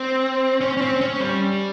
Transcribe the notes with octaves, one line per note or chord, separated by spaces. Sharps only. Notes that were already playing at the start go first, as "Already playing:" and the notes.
Already playing: C4
C#4
C#4
C4
C#4
G3